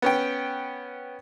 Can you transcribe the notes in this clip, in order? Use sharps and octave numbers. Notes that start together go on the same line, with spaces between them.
B3 C#4 G5